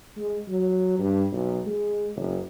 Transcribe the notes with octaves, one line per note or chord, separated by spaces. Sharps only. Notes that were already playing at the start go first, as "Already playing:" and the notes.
G#3
F#3
G2
B1
G#3
F#1